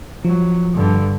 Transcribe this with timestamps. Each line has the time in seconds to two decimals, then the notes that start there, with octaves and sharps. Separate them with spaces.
0.25 F3 F#3
0.74 G2 D3